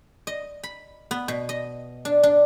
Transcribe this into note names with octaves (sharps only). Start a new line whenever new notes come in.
D#5
B5
B3
B2
D#5
D4
D4